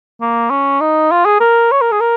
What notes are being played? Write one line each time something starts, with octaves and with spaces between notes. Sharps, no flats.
A#3
C#4
D#4
F4
G#4
A#4
C#5
A#4
G#4
A#4